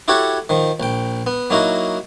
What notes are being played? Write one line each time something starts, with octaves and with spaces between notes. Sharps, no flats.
E4 F#4 G4 A4 C#5 F#5
D#3 F3
A#1 G5
B3
F#3 A#3 D#4 E4 F#4